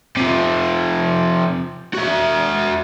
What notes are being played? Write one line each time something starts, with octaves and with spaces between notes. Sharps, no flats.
C3 F3
F#4 E5